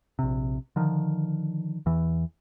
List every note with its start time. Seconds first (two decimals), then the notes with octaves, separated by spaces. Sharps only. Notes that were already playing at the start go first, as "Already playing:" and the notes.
0.19 A#1 C3
0.76 D3 D#3 F3
1.86 E2 E3